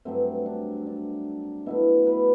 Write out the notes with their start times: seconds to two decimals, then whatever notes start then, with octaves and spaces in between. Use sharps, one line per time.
0.05 G2 F#3 A3 C4
0.46 D4
0.87 D4
1.66 B2 F#3 A3 E4
2.07 B4